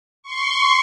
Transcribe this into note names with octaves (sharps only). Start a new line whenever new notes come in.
C6 C#6